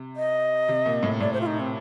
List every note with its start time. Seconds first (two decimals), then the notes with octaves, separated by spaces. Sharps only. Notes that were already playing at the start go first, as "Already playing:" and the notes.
Already playing: C3
0.16 D#5
0.69 C3
0.86 A#2
1.03 A2
1.20 A2 D5
1.33 C5
1.41 F4
1.46 D#4
1.60 C4